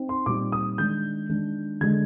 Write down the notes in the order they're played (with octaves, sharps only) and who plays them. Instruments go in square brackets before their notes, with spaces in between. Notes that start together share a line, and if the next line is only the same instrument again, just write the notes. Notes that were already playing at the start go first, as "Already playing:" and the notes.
Already playing: [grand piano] C4 D#4
C6
A#2 G3 C4 D#4 D6
D#6
D#3 G#3 D4 G6
D#3 G#3 D4
D3 G#3 D4 G#6